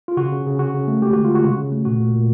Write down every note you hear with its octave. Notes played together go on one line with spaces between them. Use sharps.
F4
C#3 F#4
C#3
C#3
C#3 F#4
C#3
A3
G#3 G4
D3 F#4
G#3 F4
F#4
C#3
C#3
A3
A#2 F#4
A#2
A#2